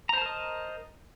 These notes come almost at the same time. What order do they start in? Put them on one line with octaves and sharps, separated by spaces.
A#5 C5 A5 A#4 D#5